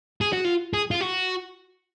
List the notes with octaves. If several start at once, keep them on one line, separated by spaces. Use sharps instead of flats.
G#4
F#4
F4
G#4
F4
F#4